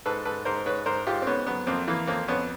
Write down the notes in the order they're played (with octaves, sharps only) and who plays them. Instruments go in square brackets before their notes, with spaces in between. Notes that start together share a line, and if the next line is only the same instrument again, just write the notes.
[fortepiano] G#2 A4 B4
G#2 A4 B4
G#2 A#4 C5
G#2 B4 C#5
G#2 A#4 C5
G#2 F4 G4
C4
G#2 B3 C#4
F#3 B3
F2 A#3 C4
E3 A#3
F2 A#3 C4
F2 B3 C#4